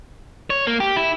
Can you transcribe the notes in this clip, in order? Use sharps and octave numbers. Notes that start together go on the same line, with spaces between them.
C#5
A#3
G4
E4